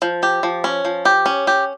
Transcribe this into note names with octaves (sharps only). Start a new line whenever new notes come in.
F3
G4
F3
C#4
F3
G4
C#4
G4